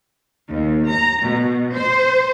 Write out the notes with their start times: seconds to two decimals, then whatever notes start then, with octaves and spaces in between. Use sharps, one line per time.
0.49 D#2
0.88 A#5
1.23 B2
1.75 C5